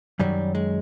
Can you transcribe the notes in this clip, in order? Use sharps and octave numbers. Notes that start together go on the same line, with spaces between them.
F#2 D#3 F#3 G3
G#3